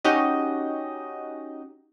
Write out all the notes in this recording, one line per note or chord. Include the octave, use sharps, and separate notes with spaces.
C#4 D#4 F#4 G4 D#5